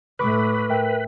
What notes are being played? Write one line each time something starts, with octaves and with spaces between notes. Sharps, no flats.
A2 A3 B4 B5 C#6 D6
A#4 E5 G5